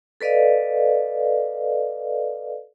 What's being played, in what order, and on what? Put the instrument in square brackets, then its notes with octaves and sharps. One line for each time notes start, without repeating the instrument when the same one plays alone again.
[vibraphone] A4 B4 D5 D#5 F5